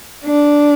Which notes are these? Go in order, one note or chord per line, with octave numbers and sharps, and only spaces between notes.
D4